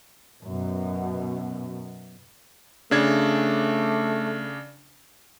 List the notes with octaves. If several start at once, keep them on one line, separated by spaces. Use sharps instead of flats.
F#2 B2
C#3 A3 D4 G#6